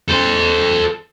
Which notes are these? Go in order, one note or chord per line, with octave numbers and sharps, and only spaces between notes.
A4 C5